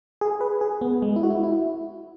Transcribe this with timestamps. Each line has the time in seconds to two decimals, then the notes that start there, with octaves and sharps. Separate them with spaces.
0.21 G#4
0.41 B4
0.61 G#4
0.81 B3
1.02 G#3
1.16 E4
1.23 F#4
1.30 E4
1.43 E4